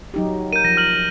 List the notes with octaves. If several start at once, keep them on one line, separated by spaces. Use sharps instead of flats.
F#3 D#4 G4
A#4 G6 D#7
F3 A#6
F6 F#7